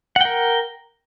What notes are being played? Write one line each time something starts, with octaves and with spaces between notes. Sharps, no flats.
A#4 F#5 G5